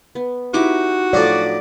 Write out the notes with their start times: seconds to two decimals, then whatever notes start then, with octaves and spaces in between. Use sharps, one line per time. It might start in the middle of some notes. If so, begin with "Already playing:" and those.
0.15 B3
0.54 D#4 E4 F#4 G4 D6
1.13 A2 F3 F#3 D5